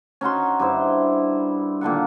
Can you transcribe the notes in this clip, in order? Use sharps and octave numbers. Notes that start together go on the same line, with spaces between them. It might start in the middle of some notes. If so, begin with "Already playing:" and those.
C#4 D#4 F#4 C6
G2 E4 C5
A#2 D3 D#3 F#5